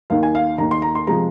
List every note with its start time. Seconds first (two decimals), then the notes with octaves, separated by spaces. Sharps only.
0.10 D#2 D#3 A#3 F5
0.23 G#5
0.35 F5
0.58 D#2 D#3 A#3 A#5
0.71 C6
0.82 A#5
0.95 C6
1.07 C3 F3 G#3 A#5